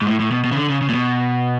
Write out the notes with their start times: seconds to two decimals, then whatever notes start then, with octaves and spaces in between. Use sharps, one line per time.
0.02 G#2
0.07 A2
0.20 A2
0.32 B2
0.44 B2
0.52 C#3
0.57 D3
0.70 C#3
0.82 C#3
0.89 A#2
0.94 B2